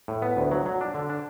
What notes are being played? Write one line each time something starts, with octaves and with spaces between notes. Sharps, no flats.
A2
B3
D2
F#3
F#3
D4
D3
D4